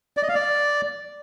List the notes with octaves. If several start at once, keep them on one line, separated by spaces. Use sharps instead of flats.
D5
D#5
F5
D5